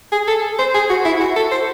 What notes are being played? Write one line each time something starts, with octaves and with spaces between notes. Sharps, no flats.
G#4
A4
C5
G#4
F#4
E4
F#4
A4
C5